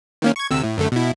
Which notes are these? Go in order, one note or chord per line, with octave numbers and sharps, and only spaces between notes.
D#3 A#3 C#4
C#6 G#6
D2 C3 E6
A2
F#2 D3 A3
B2 E4